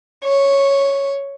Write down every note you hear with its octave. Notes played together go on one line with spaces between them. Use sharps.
C#5